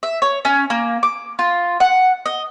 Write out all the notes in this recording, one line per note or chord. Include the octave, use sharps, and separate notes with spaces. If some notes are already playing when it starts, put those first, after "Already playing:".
E5
C#5
C#4
A#3
D6
F4
F#5
D#5